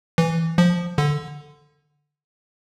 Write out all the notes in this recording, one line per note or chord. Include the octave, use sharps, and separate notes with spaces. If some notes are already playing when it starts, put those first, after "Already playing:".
E3
F3
D3